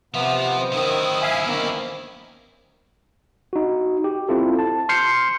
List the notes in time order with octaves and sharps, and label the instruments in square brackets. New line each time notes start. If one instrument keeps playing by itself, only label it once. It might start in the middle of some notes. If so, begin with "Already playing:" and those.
[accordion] C3 B3 [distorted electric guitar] F3 [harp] E5 F5
[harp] C#4 C5 D#5
[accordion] D#3 D#6 [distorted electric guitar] F#3 E4
[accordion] E5 F5 G#5
[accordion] D#3 A#3 [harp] B3 C#4 D4
[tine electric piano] D#4 F#4
G4
C4 E4 F4 A4
A5
C6 F6 G6 C7 C#7